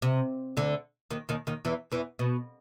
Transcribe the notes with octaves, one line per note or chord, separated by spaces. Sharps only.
C3
D2 D3
D#2 D#3
D#2 D#3
D#2 D#3
E2 E3
E2 E3
B2